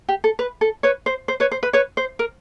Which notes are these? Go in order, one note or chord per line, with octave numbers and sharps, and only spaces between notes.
G4
A4
B4
A4
B4 C#5
C5
C5
B4 C#5
C5
B4
B4 C#5
C5
A#4